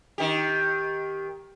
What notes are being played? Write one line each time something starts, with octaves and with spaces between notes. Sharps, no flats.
D#3 G4